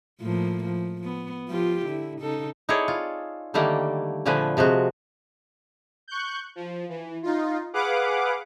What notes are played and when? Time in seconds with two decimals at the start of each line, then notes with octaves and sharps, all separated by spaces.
0.21 A2 F3 A#3
0.64 F3
1.04 B3
1.49 F3 F4 G4
1.86 D3 E4
2.21 C#3 D#4 A4
2.69 D#4 E4 G#4 A4 C#5 D5
2.88 F4
3.54 D3 D#3 G3 A3 A#3
4.26 A#2 D3 F3 A3 B4 G#5
4.57 C3 F3 G#3 F#4
6.08 C#6 F#6 G6
6.56 F3
6.89 E3
7.23 D#4 F4
7.74 G#4 B4 F5 F#5 D6